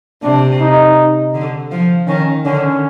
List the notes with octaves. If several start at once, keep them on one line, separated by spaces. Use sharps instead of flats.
C3 D4
D#4
D3
F3
D#3 C#4
D3 C#4